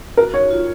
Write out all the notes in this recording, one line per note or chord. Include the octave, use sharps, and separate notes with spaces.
F#4 A#4
D#4 C#5
F4